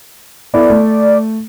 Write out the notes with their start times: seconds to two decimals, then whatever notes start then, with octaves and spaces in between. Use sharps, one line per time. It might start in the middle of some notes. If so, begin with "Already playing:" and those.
0.54 B3 E4 A4 D5
0.70 A3